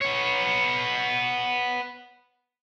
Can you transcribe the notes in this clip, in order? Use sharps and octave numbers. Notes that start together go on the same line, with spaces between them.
B3 C#5